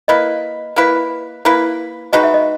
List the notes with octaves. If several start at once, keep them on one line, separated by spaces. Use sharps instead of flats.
A#3 E4 B4 D#5
A#3 E4 B4
A#3 E4 B4
G#3 D#4 F#4 B4 D#5
E5
D#5